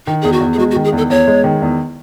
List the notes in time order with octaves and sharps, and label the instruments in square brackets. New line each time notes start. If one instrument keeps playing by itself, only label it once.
[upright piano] D#3 [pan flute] D#4
[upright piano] E2 [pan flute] G#4
[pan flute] F#4
[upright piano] E2
[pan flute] G#4
[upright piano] G#3 [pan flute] F#4
[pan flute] F#4
[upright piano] D#3
[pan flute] G#4
[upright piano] E2 [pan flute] A4
[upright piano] E2 [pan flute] C#5
[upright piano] G#3
D#3
E2